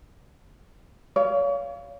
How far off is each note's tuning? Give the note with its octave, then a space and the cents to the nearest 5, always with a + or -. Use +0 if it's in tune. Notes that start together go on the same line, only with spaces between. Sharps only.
C#5 +35 F5 -10